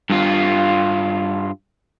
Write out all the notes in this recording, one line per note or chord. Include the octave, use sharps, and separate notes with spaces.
G2 F4